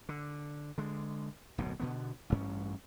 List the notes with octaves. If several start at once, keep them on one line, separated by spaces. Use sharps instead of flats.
D3
D3 G#3
D1 B1 F#2 B2
B2 D3 B3
A1 G2 C#4